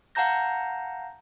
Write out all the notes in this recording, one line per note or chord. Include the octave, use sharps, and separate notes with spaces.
F5 F#5 A5 A#5 G6 A#6